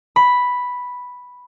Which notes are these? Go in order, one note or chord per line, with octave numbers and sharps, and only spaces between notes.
B5